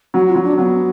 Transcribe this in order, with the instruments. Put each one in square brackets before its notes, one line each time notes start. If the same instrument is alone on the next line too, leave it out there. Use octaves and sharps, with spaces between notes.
[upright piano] F#3 [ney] F#4
[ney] F4
[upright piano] F#3
[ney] D4
[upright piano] F#3 [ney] B3